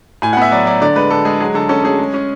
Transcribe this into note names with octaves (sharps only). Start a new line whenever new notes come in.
A2 G#5
F#5
B3 E5
F#3 D5
F#3 D5
D3 D5
G#3 B4
D3 A4
G#3 G#4
F#3 G#4
D3 A4
C#4 A4
C#4 G#4
G#3
C#4